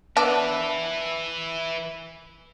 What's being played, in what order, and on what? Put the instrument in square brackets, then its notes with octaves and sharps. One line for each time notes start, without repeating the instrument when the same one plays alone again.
[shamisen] B3 D4 [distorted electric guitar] B4 E5